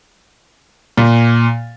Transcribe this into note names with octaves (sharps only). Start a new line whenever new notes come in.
A#2